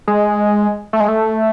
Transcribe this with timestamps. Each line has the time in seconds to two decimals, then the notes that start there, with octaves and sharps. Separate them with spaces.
0.08 G#3
0.93 A3
1.00 G#3
1.08 A3